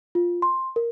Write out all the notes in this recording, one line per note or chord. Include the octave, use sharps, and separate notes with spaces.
F4
C6
A#4